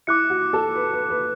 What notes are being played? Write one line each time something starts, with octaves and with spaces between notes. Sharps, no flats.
E4 D6 F#6 C#7
F#4
A4
B4
B4
B4